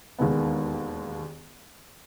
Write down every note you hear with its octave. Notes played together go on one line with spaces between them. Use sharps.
E1 D#2 D#3 G#3 B3